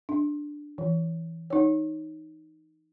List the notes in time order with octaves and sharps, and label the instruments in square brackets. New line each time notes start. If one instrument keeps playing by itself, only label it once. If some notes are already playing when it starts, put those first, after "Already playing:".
[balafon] D4
E3
D#4 C#5